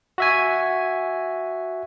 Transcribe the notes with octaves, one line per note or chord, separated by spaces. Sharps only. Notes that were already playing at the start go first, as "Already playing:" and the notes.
F#4 E5 G#5